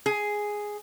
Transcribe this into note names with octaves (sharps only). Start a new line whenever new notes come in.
G#4